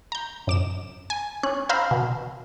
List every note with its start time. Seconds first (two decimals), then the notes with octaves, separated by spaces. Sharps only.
0.12 A#5 G6
0.47 F#2 D6 E7
1.10 G#5
1.43 C#4 F#6
1.69 C5 F5 A#5 B5 E6
1.91 B2